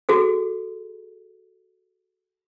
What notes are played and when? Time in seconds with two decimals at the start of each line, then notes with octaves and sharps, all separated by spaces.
0.09 F#4 G#4 A4